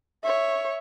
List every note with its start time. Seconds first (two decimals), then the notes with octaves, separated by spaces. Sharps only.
0.23 C#5 E5